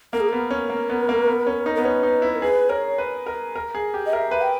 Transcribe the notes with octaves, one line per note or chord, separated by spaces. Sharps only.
A#3 A#4
G#4
B3 A#4
C#4
A#3
B3
A#3
B3
C#4
D#4
B3 A#4
C#4 B4
D#4
E4
A#4
G#4 B4
A#4 C#5
B4
A#4
A#4
G#4
G4
D#5
A#4 E5
B4
G5